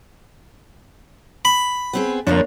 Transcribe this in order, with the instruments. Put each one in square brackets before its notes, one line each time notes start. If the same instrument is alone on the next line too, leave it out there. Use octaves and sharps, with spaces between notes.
[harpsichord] B5
[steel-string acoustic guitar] B3 C4 G#4
[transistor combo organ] F2 [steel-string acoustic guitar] C#3 F3 C#5 [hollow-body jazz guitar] A#3 D4